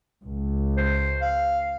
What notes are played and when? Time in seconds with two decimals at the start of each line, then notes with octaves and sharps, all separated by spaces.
0.23 C#2
0.77 C5
1.21 F5